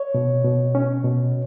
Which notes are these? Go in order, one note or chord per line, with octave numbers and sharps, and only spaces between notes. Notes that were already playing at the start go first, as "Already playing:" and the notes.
Already playing: C#5
B2
B2
C#4
B2